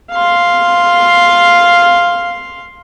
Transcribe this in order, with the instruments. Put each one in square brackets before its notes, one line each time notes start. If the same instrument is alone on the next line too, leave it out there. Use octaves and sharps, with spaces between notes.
[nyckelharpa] F5 C6